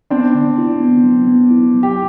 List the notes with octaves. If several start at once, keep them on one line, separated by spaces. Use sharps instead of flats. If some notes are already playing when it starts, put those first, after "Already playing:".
B3 C4 D4
D3
E4
B3
F#3
B3
E4
F#3
G4